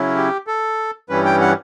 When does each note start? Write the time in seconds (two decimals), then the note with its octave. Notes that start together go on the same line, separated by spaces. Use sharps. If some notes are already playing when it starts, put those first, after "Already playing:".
Already playing: C#3 F#3 C#4 E4
0.16 G4
0.47 A4
1.09 G2 E3 G3 C#4 B4
1.25 G5
1.41 F#5